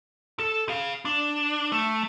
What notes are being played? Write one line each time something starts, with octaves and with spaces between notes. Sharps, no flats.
A4
G#4 F5
D4
A3